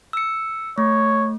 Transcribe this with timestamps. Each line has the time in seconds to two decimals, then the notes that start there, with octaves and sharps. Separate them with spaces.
0.13 E6 C#7
0.78 A3 C#5